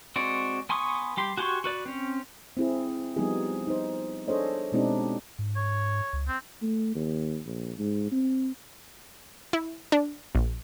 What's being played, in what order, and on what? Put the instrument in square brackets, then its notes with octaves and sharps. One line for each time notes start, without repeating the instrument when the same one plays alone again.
[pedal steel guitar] G#3 C4 F#4 D5
B3 G#5 C6 C#6 D#6
G3 G4 C6
F#4 G4 G#5 C6 C#6
F#4 B4 D5
C4 C#4
[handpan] C4 E4 G#4
F3 G3 B3 D#4 G#4
D#4 C5
D4 G#4 A4 C5 C#5 D#5
B2 G#3 C4 D4 D#4 G4
[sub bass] G#2
[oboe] C#5
[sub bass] C#2
[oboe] C4
[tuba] A3
D#2
A#1
G#2
C4
[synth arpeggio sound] E4
D4
A#1